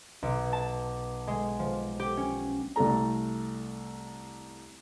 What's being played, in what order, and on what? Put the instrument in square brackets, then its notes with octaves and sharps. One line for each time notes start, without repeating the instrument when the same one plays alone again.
[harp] B1
A5
G#3
F3
G4
C#4
[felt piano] C2 A3 A4 A#5